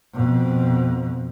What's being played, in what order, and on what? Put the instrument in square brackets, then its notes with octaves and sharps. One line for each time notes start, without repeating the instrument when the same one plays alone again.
[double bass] F2 B2